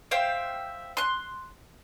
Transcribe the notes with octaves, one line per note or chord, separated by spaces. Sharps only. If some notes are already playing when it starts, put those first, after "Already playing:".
C5 E5 F5 G5
C6 F#6